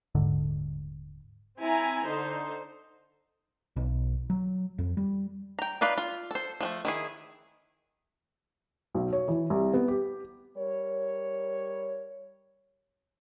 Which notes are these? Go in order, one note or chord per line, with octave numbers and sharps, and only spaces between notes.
D#1 G#2 D3
C4 E4 G#5 A#5
D3 D#4 C5
B1
F#3
F2
G3
G5 A#5
D#4 F4 B4 D5 F5
F4
A4 C5
F3 G#3 A3
D#3 E4 G#4
B1
C#5
E3
C2
B3
G4
G3 A#4 C#5